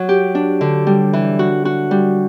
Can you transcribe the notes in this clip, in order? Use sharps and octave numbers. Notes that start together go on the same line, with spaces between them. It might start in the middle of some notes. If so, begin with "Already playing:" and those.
Already playing: F#3
G4
D4
D3
G3
E3
F#4
F#4
G3